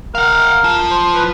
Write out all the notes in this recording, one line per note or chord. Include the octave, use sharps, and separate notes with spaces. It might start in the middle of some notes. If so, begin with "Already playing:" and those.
A#4 F5 F#5
F4 A5
C5
B4